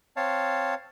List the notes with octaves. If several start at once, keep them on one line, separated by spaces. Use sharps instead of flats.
C4 C#5 F5 A5